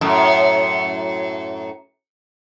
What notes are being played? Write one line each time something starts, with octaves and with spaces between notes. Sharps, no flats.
F#2 A2